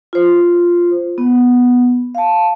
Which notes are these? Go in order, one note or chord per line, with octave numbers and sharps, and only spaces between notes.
F4 C5
B3
F5 A5